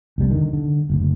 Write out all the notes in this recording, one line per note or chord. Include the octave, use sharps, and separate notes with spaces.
F1 C2 G3 B3
D3 D#3
D3
F#1 D2